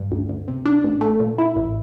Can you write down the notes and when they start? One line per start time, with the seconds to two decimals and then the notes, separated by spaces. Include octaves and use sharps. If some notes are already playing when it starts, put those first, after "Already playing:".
Already playing: G2
0.11 D2
0.29 D2
0.48 C3
0.65 D4
0.84 A1
1.01 A3
1.20 A#2
1.38 E4
1.56 A1